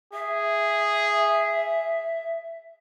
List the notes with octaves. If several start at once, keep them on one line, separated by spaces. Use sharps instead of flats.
G#4 E5